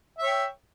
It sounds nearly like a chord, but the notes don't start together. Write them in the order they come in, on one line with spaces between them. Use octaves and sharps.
E5 C#5 G5